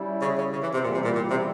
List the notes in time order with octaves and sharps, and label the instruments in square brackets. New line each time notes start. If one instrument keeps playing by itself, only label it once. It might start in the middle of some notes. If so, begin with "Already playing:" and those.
Already playing: [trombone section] G3 C#4 E4
[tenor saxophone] C#3
C#3
C#3
E3
C3
[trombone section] E2 C#3 E3 G3 [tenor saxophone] A#2
[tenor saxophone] C3
A#2
A#2
C3